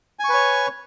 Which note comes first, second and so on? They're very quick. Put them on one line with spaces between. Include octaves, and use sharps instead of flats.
G#5 C#6 B4 C#5